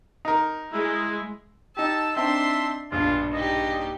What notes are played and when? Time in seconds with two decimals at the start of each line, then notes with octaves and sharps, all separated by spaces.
0.25 D#4 A#4
0.73 G#3 E4
1.77 D#4 G4 A5 E6
2.16 C4 D4 D#4 E5 A5 C6
2.92 A#1 G2 B2 D4 F4
3.33 D#4 G4 D#5